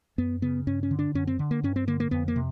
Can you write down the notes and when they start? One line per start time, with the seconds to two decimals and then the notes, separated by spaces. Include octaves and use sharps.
0.18 F#2 B3
0.42 C#3 B3
0.67 G2 C#4
0.83 C#4
0.91 D3
0.99 D4
1.15 F#2 C#4
1.27 C4
1.39 D3
1.51 A#3
1.63 G2 C#4
1.76 C4
1.87 D3 A#3
2.00 A#3
2.11 F2 B3
2.28 A#3
2.36 C3